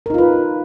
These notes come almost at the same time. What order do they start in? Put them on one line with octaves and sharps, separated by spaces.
A#4 D#4 F4 B4